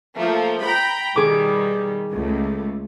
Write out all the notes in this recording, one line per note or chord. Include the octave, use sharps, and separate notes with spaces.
F3 A3 A#3
G5 A#5 B5
B2 D#3 G3 G#4 D6
C#2 A3